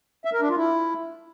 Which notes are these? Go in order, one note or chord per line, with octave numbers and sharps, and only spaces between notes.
E5
A#4
D4
F4
E4